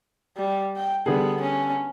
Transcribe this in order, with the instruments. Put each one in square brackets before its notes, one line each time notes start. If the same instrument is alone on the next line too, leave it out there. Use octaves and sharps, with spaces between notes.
[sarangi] G3
G5
[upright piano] D3 G3 G#4 [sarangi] B3
[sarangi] C#4